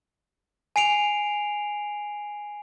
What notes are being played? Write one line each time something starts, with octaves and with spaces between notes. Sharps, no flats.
G#5 C7 D7 F7